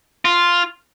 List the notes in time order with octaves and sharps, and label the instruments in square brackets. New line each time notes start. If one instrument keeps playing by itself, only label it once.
[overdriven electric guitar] F4